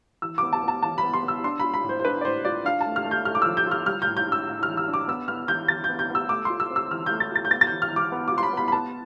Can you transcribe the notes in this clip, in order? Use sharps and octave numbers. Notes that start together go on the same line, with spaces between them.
E3 E6
B3 D6
A5
B3
A5
E3 A5
B5
B3
C6
B3
E6
D4 C6
F4 B5
B5
A2
C5
C5
D4 B4
D5
A2 C5
F4 D5
D4 F5
A5
A3
F6
A3
G6
A3 F6
D6
F3 E6
G6
F4 F6
G3 F6
G6
A2
G6
D4 E6
A2
E3 F6
E6
D4
D6
B3 E6
B3 F6
E3 G6
E3 A6
B3 G6
G6
B3 E6
A3 D6
F4 C6
E6
C4
E6
E3 F6
A3 G6
A6
F4 A6
G6
B3 A6
A6
E3 G6
F6
E3 D6
B3
F4 D6
C6
B5
B3 B5
B5
B3 A5